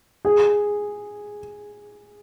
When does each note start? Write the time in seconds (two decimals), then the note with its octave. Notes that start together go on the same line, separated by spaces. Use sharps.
0.25 G#4